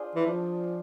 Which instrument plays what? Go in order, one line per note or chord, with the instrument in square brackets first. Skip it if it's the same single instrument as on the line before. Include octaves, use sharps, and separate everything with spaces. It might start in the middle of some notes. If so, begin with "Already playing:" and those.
Already playing: [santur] D4 F4 G#4 C5
[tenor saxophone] E3
[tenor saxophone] F3 [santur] D4